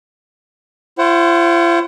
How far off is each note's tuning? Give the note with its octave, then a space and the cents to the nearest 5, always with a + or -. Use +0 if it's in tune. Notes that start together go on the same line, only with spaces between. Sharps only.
F4 -45 C5 +25 F#5 +25